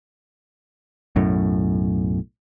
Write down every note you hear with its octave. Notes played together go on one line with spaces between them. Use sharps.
B1 F#2 A2